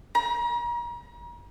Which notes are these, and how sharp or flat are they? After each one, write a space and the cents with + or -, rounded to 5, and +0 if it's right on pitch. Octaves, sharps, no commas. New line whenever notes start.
A#5 +40